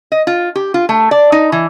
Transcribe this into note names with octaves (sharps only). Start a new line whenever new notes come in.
D#5
F4
G4
F4
A3
D5
D#4
E3